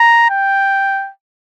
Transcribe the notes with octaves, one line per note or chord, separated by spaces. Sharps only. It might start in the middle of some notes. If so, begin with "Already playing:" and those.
Already playing: A#5
G5